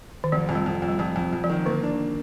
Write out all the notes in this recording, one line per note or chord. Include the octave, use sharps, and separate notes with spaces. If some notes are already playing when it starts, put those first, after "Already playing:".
D#3
F1 F3
F2
G3
F2
F2
G3
F2 F3
F2
F2
F3
D#3
D3 A#3
D4